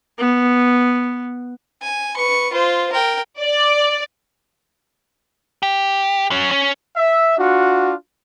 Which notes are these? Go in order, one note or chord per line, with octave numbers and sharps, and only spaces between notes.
B3
G#5
B4 C#6
F4 C5
A#4 G5
D5
G4
F#3 C#4
C#4
E5
D4 F4 F#4